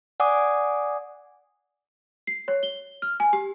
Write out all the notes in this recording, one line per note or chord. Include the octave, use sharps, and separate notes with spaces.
D5 F#5 G#5 D6 D#6
C7
C#5
G7
F6
G#5
G4